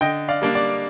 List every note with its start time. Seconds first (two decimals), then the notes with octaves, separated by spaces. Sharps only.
0.01 D3 D#5 G5
0.29 D5 F5
0.42 G3 A#3 D4
0.55 D5